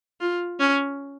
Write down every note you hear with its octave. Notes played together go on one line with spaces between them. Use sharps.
F4
C#4